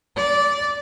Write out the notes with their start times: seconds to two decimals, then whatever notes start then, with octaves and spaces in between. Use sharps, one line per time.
0.16 D5